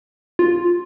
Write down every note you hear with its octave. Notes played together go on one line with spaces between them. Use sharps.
F4